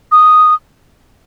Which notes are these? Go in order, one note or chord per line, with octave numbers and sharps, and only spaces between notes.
D#6